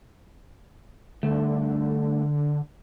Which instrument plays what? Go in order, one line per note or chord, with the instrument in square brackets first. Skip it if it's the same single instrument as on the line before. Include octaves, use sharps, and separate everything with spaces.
[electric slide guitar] G2 A3 [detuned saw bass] D3